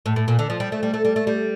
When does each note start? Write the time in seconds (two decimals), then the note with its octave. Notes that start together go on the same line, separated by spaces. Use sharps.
0.06 A2
0.16 A2
0.28 A#2
0.39 D3
0.50 F3
0.60 G3
0.72 A3
0.83 G3
0.94 A3
1.05 G3
1.16 A3
1.27 G3